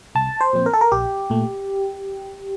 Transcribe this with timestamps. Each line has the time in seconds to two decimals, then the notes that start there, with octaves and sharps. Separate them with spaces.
0.15 C2 A5
0.41 C5
0.53 A#2 F3 C4
0.66 A#4
0.73 A4
0.81 A#4
0.92 A#1 G4
1.30 A#2 A3